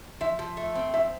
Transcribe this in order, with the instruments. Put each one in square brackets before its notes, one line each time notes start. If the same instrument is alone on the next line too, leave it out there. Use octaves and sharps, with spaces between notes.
[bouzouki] F3 [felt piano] E5
[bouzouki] F3
A3
C4
[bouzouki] F3 [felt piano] E5